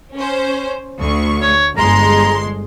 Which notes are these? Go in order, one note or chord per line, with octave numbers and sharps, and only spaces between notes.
C#4 C5
D2 C#6
C#5
G1 G#3 A#5 C6